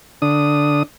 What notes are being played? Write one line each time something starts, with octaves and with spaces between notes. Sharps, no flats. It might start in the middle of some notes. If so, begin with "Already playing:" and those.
D3 D4 D#6